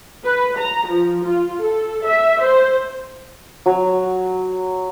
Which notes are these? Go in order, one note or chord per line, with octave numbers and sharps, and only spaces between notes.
B4
A#5
F3
F4
A4
E5
C5
F#3